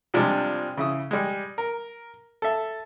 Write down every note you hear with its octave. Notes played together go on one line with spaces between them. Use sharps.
C3 F3 G3 G#3 D4
C#3 E4 D#6
G3 G#3
A#4
A4 E5